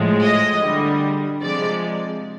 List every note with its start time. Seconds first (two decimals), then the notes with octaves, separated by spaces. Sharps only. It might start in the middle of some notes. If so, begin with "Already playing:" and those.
Already playing: A2 F3 G#3
0.21 D#5
0.61 D3 G3
1.42 C3 F3 G#3 D5